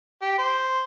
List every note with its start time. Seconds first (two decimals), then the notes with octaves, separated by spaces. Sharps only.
0.22 G4
0.38 C5